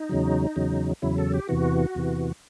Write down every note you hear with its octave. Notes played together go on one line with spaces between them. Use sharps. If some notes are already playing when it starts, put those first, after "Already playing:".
Already playing: D#4
E2 C#3 F#3
E2 C#3 F#3
E2 C#3 F#3 E4
A4
G4
E2 C3 E3 F#4
E2 C3 E3